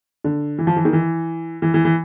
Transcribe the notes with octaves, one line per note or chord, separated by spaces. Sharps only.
D3
E3
F3
E3
D#3
E3
E3
E3
E3